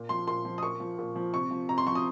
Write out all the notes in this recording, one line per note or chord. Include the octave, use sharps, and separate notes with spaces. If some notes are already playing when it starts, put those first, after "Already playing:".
Already playing: A#2
F3 C6
A#2 C6
F3
D#6
A#2 C#6
F3
A#2
F3
C3 C#6
F3
C3 A#5
C6
F3 C#6
D#6